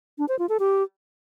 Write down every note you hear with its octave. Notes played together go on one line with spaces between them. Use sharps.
D4
C5
F4
A4
G4